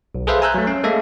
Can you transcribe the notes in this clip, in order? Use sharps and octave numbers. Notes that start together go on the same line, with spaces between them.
B1
G#4 A4 B4 C5 E5 F5
G#5 A#5 E6 F#6 G6
F#3 A3
C#4
G#3 A#3 A4 E5